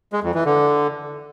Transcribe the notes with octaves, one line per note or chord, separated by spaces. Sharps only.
G#3
F2
E3
D3